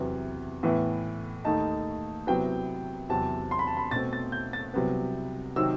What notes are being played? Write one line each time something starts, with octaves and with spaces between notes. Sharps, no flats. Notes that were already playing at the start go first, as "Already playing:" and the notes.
Already playing: E2 C3 F#3 B3
A2 E3 B3 E4
D#2 D#3 A3 D#4 A5
C3 F#3 B3 E4 G5
E2 C3 F#3 C4 A5
C6
B5
A5
B5
B2 A3 C4 A6
A6
G6
A6
C2 C3 F#3 B3
C3 D#3 F#3 C4 E6